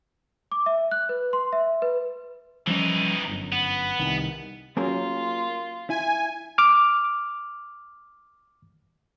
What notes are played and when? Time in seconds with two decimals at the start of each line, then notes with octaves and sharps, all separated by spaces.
0.52 D6
0.66 E5
0.91 F#6
1.09 B4
1.33 C6
1.53 E5
1.82 B4
2.67 E3 F3 G3 C#4 D#4
3.28 G1 F#2
3.52 B3
3.99 C2 D#3
4.77 F#3 A#3 C#4 F4 G#4 A#4
5.90 E4 G#5
6.58 D6 F6